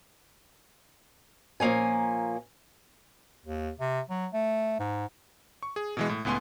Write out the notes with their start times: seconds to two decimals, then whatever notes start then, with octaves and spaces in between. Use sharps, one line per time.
1.60 A#2 F3 A#3 C#4 G#5
3.46 D#2
3.80 C3
4.09 F#3
4.33 A3
4.80 G#2
5.63 C#6
5.76 G#4
5.97 B2 E3 G#3
6.09 A2
6.25 C#2 A2 B3 G#5 C6